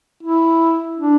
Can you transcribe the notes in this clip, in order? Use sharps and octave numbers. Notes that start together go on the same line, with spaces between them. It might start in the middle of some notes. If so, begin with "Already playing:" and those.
E4
D4